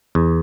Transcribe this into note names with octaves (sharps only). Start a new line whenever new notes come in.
E2